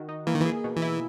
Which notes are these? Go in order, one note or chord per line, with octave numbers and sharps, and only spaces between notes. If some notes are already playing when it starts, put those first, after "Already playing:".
Already playing: D#3 F#4
D#4
E3 A#3
D#3
E3
G#4
B2
E3
E4